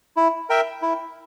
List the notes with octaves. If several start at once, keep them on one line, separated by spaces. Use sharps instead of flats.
E4
A#4 E5 G5
E4